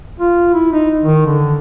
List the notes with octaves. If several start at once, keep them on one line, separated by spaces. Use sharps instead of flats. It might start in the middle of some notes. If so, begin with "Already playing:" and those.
F4
E4
D#4
D#3
D3